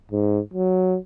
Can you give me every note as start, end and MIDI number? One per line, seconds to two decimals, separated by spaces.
0.12 0.40 44
0.54 0.98 54